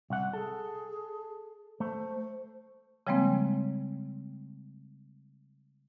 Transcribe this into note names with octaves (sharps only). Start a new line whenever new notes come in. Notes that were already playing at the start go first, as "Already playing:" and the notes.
C2 F#5
G#4 A4
A3 C5
C#3 F3 G3 G#3 A#3 C4